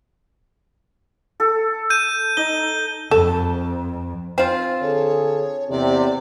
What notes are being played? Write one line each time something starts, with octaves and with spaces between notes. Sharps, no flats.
A4
G6 D#7
D#4 G7
F2 A4
C4 F4
D3 G#4 A4 C#5
E2 C3 D5